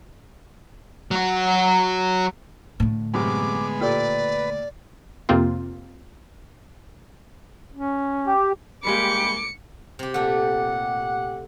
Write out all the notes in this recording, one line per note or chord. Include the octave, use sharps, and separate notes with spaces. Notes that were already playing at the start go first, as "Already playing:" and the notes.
F#3 F#4
A2 D3
F#2 C3 G#3 B3 D6
A#2 G4 A4 B4 D5
F2 C3 A#3 C4 F4
C#4
G4
G3 G#3 A#3 G4 B5 D6 C#7
C3 G4
A#2 A3 G4 A4 F#5